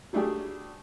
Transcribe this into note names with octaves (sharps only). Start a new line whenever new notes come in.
F#3 G3 A3 D4 G4 G#4